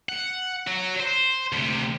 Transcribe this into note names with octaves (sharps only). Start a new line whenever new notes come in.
F#5
F#3 F#4
C5
D2 C3